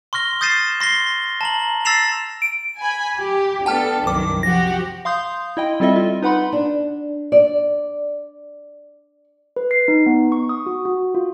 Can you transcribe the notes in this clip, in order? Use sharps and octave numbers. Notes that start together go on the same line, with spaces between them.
C6 C#6 F6 A#6 G7
D#6 G6 A6 C7 D#7 E7
C6 A#6 C7 G7
A5 A#5 F#7
E6 A6 A#6 C7 E7 F7
D7
G#5 B5
G4
B3 D4 A4 G5 A5 F6
C2 F#2 D#3 D6
F3 F#4 G4 A#6
F5 C6 D#6 G6
E4 D#5 G5
G3 C4 F4 A4 D#5 E5
F4
D#4 B4 F#5 B5 C6
D4
D5
B4
C7
D#4
B3
C#6
D#6
F#4
F#4
F4